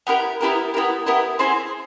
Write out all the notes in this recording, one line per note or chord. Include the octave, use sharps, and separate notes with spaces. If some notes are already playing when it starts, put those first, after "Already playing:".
B3 E4 G4 A#4
B3 E4 G4 A#4
B3 E4 G4 A#4
B3 E4 G4 A#4
C4 E4 G#4 C5